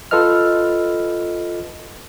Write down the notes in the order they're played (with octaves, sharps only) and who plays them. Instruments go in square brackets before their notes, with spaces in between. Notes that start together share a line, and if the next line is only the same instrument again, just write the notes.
[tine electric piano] F4 A4 B4 D#5 F6